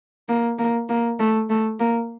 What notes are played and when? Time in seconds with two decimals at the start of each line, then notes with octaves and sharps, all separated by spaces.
0.29 A#3
0.59 A#3
0.89 A#3
1.19 A3
1.50 A3
1.80 A#3